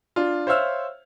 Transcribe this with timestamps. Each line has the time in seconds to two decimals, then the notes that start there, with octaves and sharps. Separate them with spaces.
0.16 D4 F4
0.47 C5 C#5 E5 F5 E6 F6